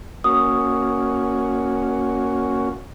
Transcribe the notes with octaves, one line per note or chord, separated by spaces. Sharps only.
A#3 C#4 F#4 D#6